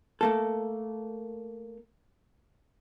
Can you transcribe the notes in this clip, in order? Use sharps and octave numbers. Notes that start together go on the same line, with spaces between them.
A3 A#3 A4